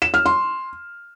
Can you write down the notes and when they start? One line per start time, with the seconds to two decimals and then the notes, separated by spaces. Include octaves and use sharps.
0.02 E7
0.14 F6
0.26 C6